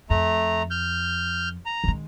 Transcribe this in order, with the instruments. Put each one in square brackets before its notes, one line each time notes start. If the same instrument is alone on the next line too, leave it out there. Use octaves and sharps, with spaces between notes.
[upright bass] F2 [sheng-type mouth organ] A3 A#5
[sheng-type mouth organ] F6 G6
A#5
[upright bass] D#3 G#3